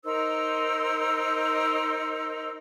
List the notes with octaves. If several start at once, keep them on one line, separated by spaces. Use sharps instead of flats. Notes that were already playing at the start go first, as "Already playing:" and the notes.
D#4 A#4 C5 E6